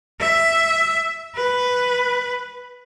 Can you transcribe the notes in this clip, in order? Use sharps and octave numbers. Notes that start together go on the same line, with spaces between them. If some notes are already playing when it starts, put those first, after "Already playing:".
E5
B4